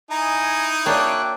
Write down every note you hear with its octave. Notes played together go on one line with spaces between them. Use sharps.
D#4 E4 D#5 G#5 A#5
A#3 D4 F#4 C#5 E5 G5 D6 F#6